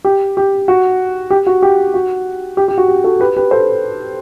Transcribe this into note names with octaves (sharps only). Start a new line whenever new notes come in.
G4
G4
F#4
G4
F#4
G4
F#4
G4
G4
F#4
G4
F#4 A4
G4 B4
G4 B4
A4 C5